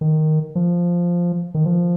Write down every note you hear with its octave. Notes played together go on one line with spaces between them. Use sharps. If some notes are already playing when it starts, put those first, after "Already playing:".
D#3
F3
D#3
F3